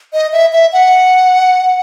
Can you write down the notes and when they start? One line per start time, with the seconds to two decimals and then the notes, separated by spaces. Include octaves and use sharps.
0.13 D#5
0.32 E5
0.53 E5
0.73 F#5